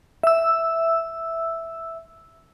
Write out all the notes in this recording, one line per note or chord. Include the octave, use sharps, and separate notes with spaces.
E5 E6